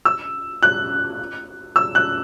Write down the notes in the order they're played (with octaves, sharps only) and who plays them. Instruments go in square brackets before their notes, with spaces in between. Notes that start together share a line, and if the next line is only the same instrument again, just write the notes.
[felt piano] E6
F#6
E6
F#6